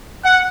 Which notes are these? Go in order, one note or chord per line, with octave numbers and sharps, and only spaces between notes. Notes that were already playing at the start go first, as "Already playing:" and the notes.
F#5